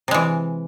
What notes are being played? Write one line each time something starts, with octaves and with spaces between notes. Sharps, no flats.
C3 E3 G#3